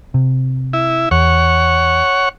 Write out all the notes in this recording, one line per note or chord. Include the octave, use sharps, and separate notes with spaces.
C3
E4 E5
E2 C#5 F#5 C#6